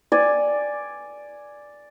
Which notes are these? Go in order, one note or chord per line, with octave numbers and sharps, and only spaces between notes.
D5 G#5